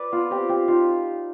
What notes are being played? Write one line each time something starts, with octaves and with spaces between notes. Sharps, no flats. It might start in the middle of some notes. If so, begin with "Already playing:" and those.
Already playing: B4 D5
B3 F4
C4 G4
C4 G4
D#4 F4